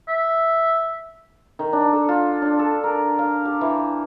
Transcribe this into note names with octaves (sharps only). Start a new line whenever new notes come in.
E5
D#3
D4
A4
F4
D4
A4
A#4
F5
G4
E3